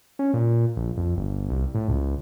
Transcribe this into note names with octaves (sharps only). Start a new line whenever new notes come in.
C#4
A#2
A#1
F2
G1
C2
A2
C#2